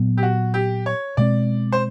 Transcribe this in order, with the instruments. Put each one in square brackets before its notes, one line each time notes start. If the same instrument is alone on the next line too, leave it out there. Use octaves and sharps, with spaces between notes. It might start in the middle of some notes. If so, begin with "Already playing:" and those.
Already playing: [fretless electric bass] A#2 F#3 B3
[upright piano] G4
F#4
G4
C#5
[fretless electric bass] B2 G#3 C4 [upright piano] D5
[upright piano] C5